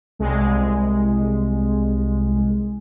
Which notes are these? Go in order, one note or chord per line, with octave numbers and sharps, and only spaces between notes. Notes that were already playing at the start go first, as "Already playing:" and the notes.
C2 G#3